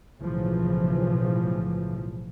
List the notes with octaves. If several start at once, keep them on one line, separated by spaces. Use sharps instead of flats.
B1 A2 C#3 E3 F3